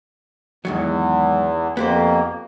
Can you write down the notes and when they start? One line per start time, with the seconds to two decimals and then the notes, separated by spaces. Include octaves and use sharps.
0.65 E2 G#2 D#3 F#3
1.77 F2 A#3 B3 G4 C5